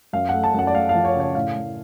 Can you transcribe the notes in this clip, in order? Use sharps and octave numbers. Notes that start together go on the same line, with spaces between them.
F#2 F5
A3 F#5
A5
F#2 F#5
D5
A3 F5
F5
F3
C#5
C#3
C#5
A2 F5
A2